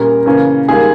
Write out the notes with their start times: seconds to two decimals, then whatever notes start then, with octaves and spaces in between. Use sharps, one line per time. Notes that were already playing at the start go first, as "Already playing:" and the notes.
Already playing: A#2 G3 C#4 A#4
0.26 C#3 E3 A#3 C#4
0.68 G#2 D#3 G3 A#3 G#4